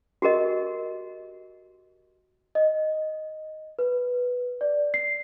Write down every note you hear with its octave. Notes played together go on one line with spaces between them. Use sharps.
F#4 G4 A#4 D#5
D#5
B4
D5
C7